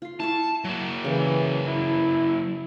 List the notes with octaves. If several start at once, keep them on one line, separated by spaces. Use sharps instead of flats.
F4 C6
E4 F5 A5 C#6
F#3 A#3
C#3 E3 G3
E4